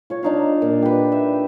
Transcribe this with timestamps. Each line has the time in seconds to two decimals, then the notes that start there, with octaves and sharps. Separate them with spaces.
0.10 F4 C#5
0.23 D4 D#4 F5
0.62 A#2
0.82 G4 B4
1.12 E5